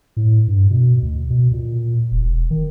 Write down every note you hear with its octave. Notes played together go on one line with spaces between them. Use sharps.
A2
G2
B2
D2
B2
A#2
E1
E1
D#3